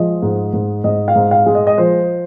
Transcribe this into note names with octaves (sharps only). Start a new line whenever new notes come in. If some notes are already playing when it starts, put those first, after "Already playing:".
Already playing: F3 G#3 D#5
G#2
G#2
G#2 D#5
F5
G#2
F5
G#3
D#5
D#5
F3 C5